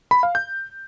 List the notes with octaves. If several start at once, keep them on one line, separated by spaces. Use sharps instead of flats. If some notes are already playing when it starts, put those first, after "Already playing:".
B5
F5
G6